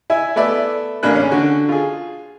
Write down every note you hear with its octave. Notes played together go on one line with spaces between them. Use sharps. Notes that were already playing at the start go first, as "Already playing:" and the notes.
E4 E5 G#5
A3 B3 D5 E5
A1 A#3 D4 G#5 B5 F#6
C#3 C#4
D3 F#4
F4 G#4